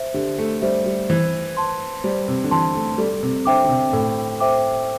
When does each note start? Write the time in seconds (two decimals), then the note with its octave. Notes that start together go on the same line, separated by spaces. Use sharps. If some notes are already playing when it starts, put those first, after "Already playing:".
Already playing: C5 E5
0.14 D3 G4
0.38 A3
0.62 G3 C5 E5
0.86 G3
1.10 E3 C5
1.57 A5 C6
2.04 G3 C5
2.28 C3
2.44 D3
2.51 E3 A5 C6
2.75 A3
2.98 G3 A4
3.23 C3
3.46 D3 C5 E5 G5 D6
3.64 D3
3.69 C3
3.93 A2 A4
4.40 C5 E5 G5 D6